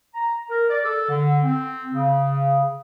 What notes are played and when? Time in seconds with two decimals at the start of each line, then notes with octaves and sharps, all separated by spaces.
0.14 A#5
0.50 A#4
0.69 D5
0.84 A4
1.09 D3
1.43 C4
1.93 C#3